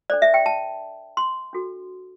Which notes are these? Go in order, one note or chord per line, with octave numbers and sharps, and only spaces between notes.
D4 A4 C5 D5
E5
G5
A5
C6
D4 F#4 A4